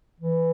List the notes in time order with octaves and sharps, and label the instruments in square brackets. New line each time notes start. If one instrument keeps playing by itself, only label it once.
[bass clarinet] E3